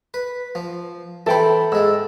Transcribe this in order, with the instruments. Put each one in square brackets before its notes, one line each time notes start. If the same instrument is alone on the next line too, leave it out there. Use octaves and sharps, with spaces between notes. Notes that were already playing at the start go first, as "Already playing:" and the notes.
[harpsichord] B4
F3
[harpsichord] E3 C5 [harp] A4 G5 B5
[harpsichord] G#2 G#3 [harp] E6